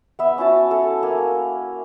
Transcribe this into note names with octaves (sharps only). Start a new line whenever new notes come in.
B3 E5
C#4 E4 F#4 A5
A4
A#3 G#5